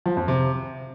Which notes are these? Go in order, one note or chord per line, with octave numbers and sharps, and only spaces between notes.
F3
F2
C3